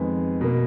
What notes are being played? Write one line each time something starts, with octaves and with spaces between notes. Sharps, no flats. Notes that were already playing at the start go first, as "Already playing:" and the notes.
Already playing: F2 D#3 G#3 B3
B2 A#3